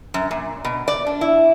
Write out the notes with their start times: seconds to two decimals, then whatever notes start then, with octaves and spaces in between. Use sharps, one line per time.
0.14 F#2
0.31 A#2
0.65 B2
0.88 D5
1.06 D4
1.21 E4